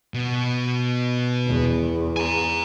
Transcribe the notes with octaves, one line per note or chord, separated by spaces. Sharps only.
B2
E2
G#5 A#5